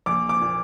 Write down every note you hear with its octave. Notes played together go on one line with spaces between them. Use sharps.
A#1 D6
D6
A#2